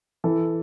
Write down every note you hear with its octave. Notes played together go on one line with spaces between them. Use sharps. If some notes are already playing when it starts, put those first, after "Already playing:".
E3 A4